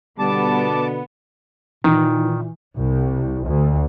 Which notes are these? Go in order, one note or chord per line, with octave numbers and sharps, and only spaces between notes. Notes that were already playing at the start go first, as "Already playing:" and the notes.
B2 D3 G3 B3 A5 D6
A#2 D#3 E3 D#4
C2
D2